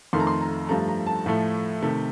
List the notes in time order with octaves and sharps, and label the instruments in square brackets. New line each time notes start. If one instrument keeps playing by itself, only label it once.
[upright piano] F2 D#3 A3 C6
A#5
C6
A#5
G2 F3 A3 A#5
A#5
A5
A2 F3 A3
C3 D#3 A3